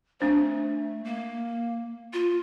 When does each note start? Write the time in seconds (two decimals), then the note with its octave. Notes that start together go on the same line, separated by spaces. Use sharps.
0.20 A3 C4 D4 C5
1.05 A#3
2.13 F4